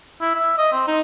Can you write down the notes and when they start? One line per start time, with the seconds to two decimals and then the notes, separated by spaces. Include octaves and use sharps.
0.21 E4
0.35 E5
0.58 D#5
0.72 C4
0.88 D#4